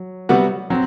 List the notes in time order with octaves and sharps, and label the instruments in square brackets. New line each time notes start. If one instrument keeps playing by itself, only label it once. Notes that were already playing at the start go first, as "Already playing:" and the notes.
Already playing: [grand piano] F#3
[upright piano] C3 G3 B3 F#4
[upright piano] F#3 [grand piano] C4